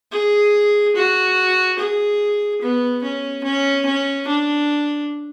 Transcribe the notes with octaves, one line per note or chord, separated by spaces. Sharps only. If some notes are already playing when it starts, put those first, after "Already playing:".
G#4
F#4
G#4
B3
C#4
C#4
C#4
D4